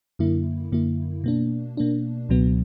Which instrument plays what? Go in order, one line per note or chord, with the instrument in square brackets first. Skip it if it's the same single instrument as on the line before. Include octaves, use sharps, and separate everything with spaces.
[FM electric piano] F#2 D3 A#3 E4
F#2 D3 A#3 E4
B2 A#3 D4
B2 A#3 D4
C#2 B2 F#3 B3